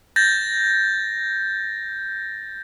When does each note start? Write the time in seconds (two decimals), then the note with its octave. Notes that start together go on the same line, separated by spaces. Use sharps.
0.16 G6 A6 A#6